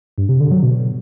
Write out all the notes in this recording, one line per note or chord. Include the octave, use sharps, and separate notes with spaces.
G2
C3
D3
F#3
B2